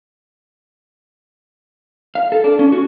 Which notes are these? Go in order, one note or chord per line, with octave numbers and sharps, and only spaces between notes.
F5
A4
D4
C#4
F#4